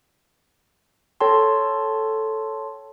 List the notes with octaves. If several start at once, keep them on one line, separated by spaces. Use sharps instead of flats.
A4 C#5 G5 A5 C6